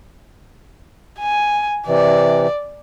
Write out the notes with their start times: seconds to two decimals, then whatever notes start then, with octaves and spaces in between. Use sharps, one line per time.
1.19 G#5
1.87 C3 E3 D5